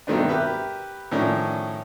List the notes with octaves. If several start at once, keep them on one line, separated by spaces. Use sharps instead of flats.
G2 B2 D#3 A3 C4 D4
G4 A#4 B4 E5
A2 D#3 F3 C#4 D4